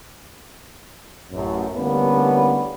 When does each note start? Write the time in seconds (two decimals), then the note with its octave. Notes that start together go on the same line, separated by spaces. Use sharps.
1.32 A1 F#2
1.77 A1 D3 G3 A#3 B3 C#4